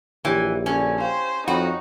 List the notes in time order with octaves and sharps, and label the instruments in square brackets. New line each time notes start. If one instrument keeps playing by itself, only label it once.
[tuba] A#1 [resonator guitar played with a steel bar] E3 [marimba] G4 C#5 G5
[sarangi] D3 [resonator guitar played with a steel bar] C#4
[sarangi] C5 [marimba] F5 G5 C6
[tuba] F2 [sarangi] D#4 [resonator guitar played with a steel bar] F#4 [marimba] C#5 G5 B5